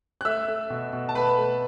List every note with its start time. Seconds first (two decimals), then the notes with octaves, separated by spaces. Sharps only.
0.21 F#6
0.25 A3 E5 E6
0.48 A3
0.70 B2
0.93 B2
1.09 A5
1.15 A3 B4 B5
1.38 A3